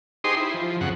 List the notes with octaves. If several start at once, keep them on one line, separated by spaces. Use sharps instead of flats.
D#4 G4 G#4 C5 C6 D#6
E4 C5
F3
F2 C#3 F#5